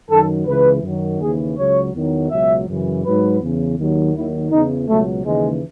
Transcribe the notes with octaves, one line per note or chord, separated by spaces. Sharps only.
F#2 D#3 F#3 A4
C#2 C#3 E3 B4
F#2 D#3 F#3
D#2 C#3 E3 G#4
C#2 C#3 F#3 C#5
E2 D#3 F#3
C#2 B2 F#3 E5
F#2 C#3 E3
G#2 F#3 B4
E2 C#3 E3
D#2 D#3 F#3
D#2 D#3 F#3 E4
E2 C#3 E3 D#4
C#2 B2 F#3 A3
D#2 C#3 E3 G#3